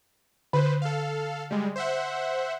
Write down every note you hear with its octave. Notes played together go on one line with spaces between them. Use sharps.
D3 B4 C5
A4 F5
G3 G#3
C5 E5 F#5